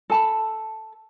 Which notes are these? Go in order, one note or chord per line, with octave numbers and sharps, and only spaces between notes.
A4 A5 B5